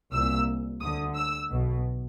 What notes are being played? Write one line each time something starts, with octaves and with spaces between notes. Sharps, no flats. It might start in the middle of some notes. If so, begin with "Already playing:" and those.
C2 A#2 E6
D2 D3 D#6
E6
B1 B2